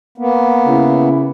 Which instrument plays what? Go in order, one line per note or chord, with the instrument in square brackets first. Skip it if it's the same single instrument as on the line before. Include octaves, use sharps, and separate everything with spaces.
[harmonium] A#3 B3
[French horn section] C#3 E4